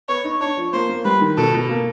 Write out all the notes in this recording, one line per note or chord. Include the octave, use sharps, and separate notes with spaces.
B3 C#5
D#4
D4 C#5
F3
A#3 C5
A#3
G3 B4
D#3
B2 A4
B2
A#3